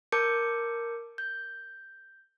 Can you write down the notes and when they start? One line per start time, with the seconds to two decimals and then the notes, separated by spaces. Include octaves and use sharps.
0.12 A#4 A5 D6 G6 C#7
1.18 G6